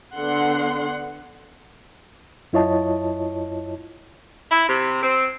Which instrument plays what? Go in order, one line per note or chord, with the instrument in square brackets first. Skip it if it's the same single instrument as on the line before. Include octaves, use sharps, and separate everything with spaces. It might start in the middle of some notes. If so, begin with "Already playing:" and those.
[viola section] D3 B3 F#5 C6
[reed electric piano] F#2 E4 F4 C#5 D#5 A5
[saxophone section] E4
C3
C4